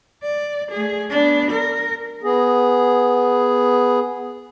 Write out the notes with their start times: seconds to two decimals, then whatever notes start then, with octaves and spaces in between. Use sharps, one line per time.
0.23 D5
0.71 A3 G#4
1.10 B3 D4
1.51 A#4
2.23 B3 G#4